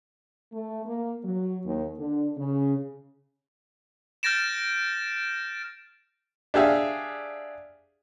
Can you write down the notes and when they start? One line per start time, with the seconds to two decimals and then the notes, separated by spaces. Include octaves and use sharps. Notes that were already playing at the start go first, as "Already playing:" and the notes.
0.52 A3
0.85 A#3
1.24 F#3
1.65 D#2
1.97 D3
2.37 C#3
4.23 F6 G6 A6 A#6 D7 E7
6.54 D4 G4 G#4 E5 F5